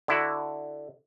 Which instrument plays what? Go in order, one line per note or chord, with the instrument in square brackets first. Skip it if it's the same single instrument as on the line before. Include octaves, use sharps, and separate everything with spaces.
[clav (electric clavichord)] D3 E4 F#4